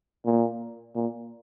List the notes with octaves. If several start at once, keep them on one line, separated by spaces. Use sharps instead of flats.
A#2
A#2